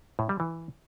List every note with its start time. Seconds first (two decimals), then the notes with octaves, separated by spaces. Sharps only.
0.19 A2
0.29 G3
0.40 E3